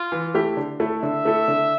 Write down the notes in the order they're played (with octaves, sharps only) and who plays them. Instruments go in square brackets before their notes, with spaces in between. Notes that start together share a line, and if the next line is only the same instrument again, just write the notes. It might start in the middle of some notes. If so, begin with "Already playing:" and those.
Already playing: [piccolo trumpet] F4
[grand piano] E3
A3 E4 G4
D3
A3 E4 A4
[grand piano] D3 [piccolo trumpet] E5
[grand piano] A3 E4 A4
D3